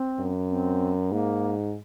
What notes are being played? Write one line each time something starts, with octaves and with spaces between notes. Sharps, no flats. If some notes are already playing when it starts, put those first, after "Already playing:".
Already playing: C4
F#2
C4
G#2 A#3